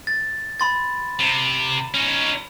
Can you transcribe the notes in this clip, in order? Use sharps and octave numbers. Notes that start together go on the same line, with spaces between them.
A6
B5 C6 A6
C3
C#4 D#4